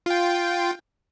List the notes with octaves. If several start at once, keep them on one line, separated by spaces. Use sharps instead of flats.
F4 G5